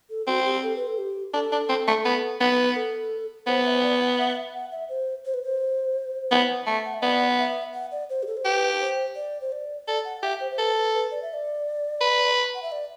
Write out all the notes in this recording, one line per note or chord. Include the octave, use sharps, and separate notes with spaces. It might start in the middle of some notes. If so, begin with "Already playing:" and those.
A4
C4 F#4
G4
A4
B4
A4
G4
D4 A4
D4
C4
A3
B3
B3
B4
A4
B3 C5
E5
C5
D5
F#5
E5
F#5
E5
F#5
E5
C5
C5
B4
C5
B3
A3
F#5
E5
B3 D5
E5
F#5
D5
C5
G4
A4
C5
G4 B4
C5
D5
C5
D5
A4 D5
F#5
G4 E5
C5
C5
A4 B4
B4
B4
D5
E5
D5
B4
F#5
E5
D5